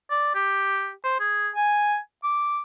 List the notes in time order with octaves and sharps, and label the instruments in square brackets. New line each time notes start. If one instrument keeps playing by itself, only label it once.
[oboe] D5
G4
C5
G#4
G#5
D6